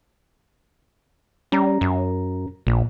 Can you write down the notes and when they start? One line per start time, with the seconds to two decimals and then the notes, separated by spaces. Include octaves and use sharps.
1.52 G3 C#4 A#5
1.81 F#2
2.67 A#1 A#2